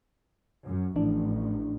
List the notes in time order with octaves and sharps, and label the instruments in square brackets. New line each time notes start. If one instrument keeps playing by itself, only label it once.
[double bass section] F#2
[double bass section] A1 [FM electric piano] E3 F3 D4